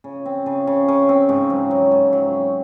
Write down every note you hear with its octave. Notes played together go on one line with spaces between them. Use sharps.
C#3
C4
C#3
C#3
C#3
C4
G#2
F#3
F#3
G#2
F#3
C4